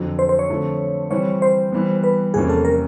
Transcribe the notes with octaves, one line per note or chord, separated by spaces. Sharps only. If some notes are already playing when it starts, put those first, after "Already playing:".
Already playing: F2 D3 F#3
C5
C5
C#5
D3 F3 A3 C4
E3 G3 C4 C#5
C5
E3 G3 B3
B4
E2 C3 F3 A#3 C#4 G#4
A4
A#4